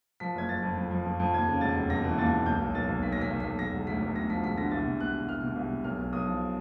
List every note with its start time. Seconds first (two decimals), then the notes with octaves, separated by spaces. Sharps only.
0.20 F3 B6
0.35 F#1 G#6
0.48 F#1 A6
0.63 F2
0.78 F2
0.91 F3
1.06 F2
1.20 F2
1.34 D#2 G#6
1.48 C#3
1.61 E1 A6
1.76 E1
1.90 E1 A#6
2.04 E3
2.18 D#2 A6
2.32 D#2
2.46 B1 G6
2.61 B1
2.75 B1 A6
2.89 B1
3.03 B1 B6
3.12 A#6
3.17 B1 B6
3.30 B1
3.40 B6
3.44 B1
3.58 E1 A#6
3.73 E1
3.87 D2 B6
4.02 E1
4.16 D2 A#6
4.29 F3 B6
4.43 E1 B6
4.57 D3 A#6
4.71 C2 A6
4.86 B2
4.99 B2 F#6
5.14 B2
5.29 C2 F6
5.43 B2
5.56 C2
5.70 B2
5.84 B1 F6
5.99 B1
6.13 B1 D#6
6.27 F3